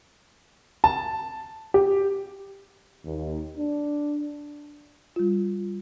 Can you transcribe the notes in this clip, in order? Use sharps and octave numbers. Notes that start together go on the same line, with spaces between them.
A5
G4
D#2
D4
G3 F4